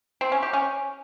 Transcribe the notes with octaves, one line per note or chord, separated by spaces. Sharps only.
C4
C#4
G4
C#4